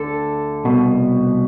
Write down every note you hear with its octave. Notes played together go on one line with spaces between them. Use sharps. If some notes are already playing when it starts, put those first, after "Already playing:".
Already playing: D2 D3 A4
C2 B2